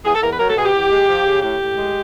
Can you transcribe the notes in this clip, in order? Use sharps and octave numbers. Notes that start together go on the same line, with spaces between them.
E2 G#4
A4
E2 A#4
B4
F#3 A#4
A4
B2 G#4
G4
E2
G#3
F3
C#3
A2 G4
A2
G#3